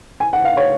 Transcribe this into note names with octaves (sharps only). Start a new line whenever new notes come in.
G#5
F#5
F5
C#5